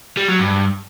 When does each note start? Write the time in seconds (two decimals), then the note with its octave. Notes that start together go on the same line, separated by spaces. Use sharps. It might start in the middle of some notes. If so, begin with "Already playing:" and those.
0.17 G3
0.28 F#3
0.39 G2